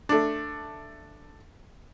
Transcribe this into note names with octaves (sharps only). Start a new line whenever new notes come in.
A3 D4